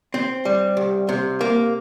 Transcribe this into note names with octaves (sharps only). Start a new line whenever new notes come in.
C4
G3
C2
C3
A#3